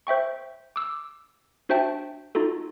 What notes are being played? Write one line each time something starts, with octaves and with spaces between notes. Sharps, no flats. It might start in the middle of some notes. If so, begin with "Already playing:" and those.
C5 E5 G5 C#6
D6 E6
D4 F#4 C5 E5 G5 A5
D#4 F4 F#4 A4